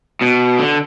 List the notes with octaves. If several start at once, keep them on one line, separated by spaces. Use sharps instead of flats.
B2
D3